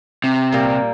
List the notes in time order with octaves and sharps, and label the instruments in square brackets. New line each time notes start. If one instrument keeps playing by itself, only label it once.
[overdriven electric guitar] C3
[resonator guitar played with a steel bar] A#2 G3 A#3